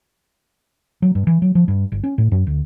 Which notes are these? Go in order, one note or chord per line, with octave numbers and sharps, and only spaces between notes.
F#3
G2
E3
F#3
F3
G2
G1
C#4
A2
F#2
D2